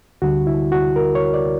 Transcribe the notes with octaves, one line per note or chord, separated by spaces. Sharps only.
D2 D3 G3 F#4
E4
F#4
A#4
C#5
D5